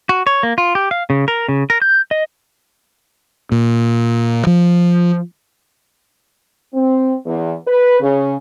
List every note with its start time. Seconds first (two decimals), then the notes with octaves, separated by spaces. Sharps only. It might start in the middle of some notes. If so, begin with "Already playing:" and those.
0.09 F#4
0.27 C#5
0.43 A#3
0.58 F4
0.75 G4
0.91 F5
1.10 C#3
1.28 A#4
1.49 C#3
1.70 A#4
1.82 G6
2.11 D#5
3.52 A#2
4.47 F3
6.73 C4
7.26 E2
7.66 B4
8.00 C#3